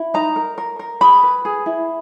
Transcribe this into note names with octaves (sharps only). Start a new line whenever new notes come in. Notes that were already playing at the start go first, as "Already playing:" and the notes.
Already playing: E4
D#4 A#5
A#4
A#4
A#4
G#4 B5
B4
G#4
E4